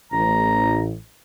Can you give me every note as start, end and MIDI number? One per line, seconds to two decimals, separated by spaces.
0.12 0.93 33
0.12 0.81 82